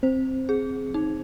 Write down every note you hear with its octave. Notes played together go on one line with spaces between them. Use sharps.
C4 C5
G#4
D#4